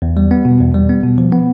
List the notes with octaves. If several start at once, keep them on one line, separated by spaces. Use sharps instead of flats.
E2
G3
B3
B2
E2
G3
B3
B2
F3
B3